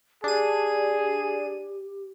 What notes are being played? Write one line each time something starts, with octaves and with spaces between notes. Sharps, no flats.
D4 G4 G#4 D#7